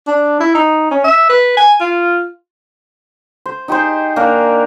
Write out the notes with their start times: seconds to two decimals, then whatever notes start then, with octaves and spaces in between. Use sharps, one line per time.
0.07 D4
0.40 E4
0.55 D#4
0.91 C#4
1.04 E5
1.30 B4
1.57 G#5
1.81 F4
3.46 C5
3.68 D#4 G4 G#4 C5
4.16 A#3 D4 A#4